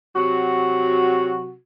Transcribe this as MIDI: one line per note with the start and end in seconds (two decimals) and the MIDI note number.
0.15 1.54 48
0.15 1.54 54
0.15 1.54 66